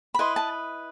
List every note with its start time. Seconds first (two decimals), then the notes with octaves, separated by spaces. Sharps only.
0.14 B5
0.19 E4 B4 D#5 C6
0.36 A5